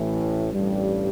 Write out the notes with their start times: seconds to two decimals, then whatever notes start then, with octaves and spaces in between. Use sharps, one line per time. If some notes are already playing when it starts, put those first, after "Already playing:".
Already playing: A1 A2 E3
0.52 A1 G2 G3